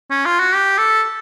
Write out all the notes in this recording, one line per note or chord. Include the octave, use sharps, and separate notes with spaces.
C#4
F4
F#4
G4
A4